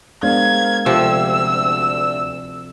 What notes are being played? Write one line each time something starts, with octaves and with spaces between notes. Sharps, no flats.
G#3 B3 D4 A#4 C5 F5 G#6
D2 C3 F3 G4 E6